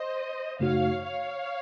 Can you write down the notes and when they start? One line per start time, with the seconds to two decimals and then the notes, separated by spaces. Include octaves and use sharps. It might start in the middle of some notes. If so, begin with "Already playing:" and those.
Already playing: C5 D#5
0.60 F#2 C#3 A3 D#4 F#4 C#5 F5
1.04 C#5 F5